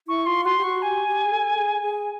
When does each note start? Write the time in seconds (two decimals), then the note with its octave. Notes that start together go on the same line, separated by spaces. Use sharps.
0.08 E4 C#6
0.26 F4 C6
0.45 F#4 C6
0.58 G4
0.64 F#4 C#6
0.82 G4 G#5
1.08 G4
1.25 G#4
1.32 A4
1.57 G#4
1.82 G#4